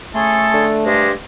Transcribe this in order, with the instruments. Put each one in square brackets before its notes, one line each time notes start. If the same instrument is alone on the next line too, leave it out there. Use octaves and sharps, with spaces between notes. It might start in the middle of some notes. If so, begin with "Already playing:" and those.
[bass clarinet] A3 [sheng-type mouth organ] C#4 G#4 C6 [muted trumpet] A4
[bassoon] D3
[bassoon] G2 [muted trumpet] G#3 [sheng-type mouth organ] G4 C5 D5